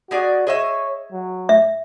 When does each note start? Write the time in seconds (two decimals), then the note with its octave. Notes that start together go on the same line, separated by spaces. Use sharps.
0.11 G#3 F#4 G#4 D5
0.47 G#4 C#5 D#5 E5
1.12 F#3
1.49 E5